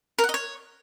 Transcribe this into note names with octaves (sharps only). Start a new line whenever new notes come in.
A#4
F#5
D#5
C#5